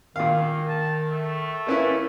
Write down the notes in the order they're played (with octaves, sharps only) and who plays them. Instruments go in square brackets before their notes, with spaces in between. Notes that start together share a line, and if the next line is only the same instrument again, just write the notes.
[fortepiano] A#2 F5 [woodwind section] D#3
[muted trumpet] A5
A3
[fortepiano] A#3 C#4 E4 [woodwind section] B4